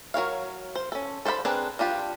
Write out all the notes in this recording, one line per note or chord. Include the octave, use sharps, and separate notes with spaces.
F#3 A#4 C#5 F5
C5
C#4 A4
A4 C5 D5 F#5 B5
C4 D4 G#4 A#4 B4
G3 D4 F4 G4